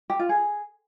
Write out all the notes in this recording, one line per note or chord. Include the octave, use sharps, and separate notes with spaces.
G4
F4
G#4